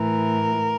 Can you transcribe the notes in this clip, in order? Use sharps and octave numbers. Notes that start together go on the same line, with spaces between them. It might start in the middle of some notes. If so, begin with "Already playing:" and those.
Already playing: A2 E3 A#4